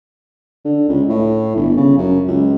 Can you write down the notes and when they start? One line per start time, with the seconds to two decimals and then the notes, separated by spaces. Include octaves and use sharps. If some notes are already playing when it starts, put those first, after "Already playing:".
0.65 D3
0.89 C#2
1.09 A2
1.56 G1
1.77 C#3
1.98 F#2
2.27 C#2